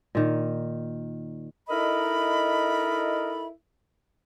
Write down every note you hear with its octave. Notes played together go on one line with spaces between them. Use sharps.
A#2 D#3
D#4 E4 A4 A#4 D#5 B5